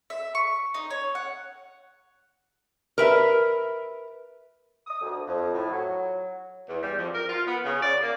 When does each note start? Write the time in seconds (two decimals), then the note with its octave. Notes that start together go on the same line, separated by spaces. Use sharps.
0.10 E5
0.35 C#6
0.74 D#4
0.90 C#5
1.15 F#5
2.98 A#4 B4 E5
4.87 D#6
5.01 D2
5.27 F2
5.52 A2
5.70 F#3
6.68 E2
6.83 G3
6.97 F2
7.14 A#4
7.29 F4
7.47 B3
7.65 C#3
7.82 D5
8.02 A#3